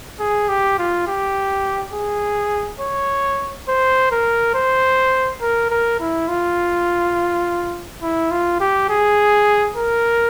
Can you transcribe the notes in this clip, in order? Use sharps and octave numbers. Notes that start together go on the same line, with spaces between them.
G#4
G4
F4
G4
G#4
C#5
C5
A#4
C5
A#4
A#4
E4
F4
E4
F4
G4
G#4
A#4